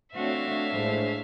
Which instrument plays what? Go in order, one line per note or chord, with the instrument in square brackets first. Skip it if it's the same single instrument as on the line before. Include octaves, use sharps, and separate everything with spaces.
[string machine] A3 D4 C#5 [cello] C4 F#4 [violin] E5 F5
[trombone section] A#1 G#3 C5 [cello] A2